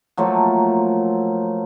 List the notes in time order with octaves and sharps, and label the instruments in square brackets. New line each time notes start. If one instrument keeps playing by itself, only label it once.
[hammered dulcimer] F3 F#3 A3 A#3